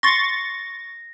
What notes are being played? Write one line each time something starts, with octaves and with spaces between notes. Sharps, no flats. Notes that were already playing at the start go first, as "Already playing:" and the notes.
C6 C#6 A6 A#6